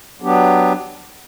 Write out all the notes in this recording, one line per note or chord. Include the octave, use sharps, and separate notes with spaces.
F#3 B3 D4 G4